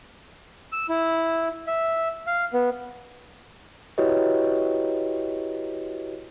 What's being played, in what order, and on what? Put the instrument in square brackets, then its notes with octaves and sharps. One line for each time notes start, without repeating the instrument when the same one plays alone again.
[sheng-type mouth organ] E6
E4
E5
F5
B3
[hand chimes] E4 F#4 G4 B4 C#5 D#5